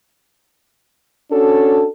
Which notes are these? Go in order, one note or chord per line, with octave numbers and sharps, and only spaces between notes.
C#4 D4 F#4 A4